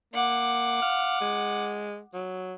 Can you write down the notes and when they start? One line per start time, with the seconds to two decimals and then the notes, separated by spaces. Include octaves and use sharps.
0.14 A#3 F#5 D6
0.82 F5
1.21 G#3
2.14 F#3